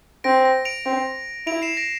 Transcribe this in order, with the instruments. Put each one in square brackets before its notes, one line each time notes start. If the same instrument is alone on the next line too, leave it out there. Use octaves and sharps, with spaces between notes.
[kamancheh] C4 [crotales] A#6 D7
[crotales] A#6
D7 F7
[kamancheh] C4
[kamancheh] E4 [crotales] D7 F7
[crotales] C7 E7
A#6 D7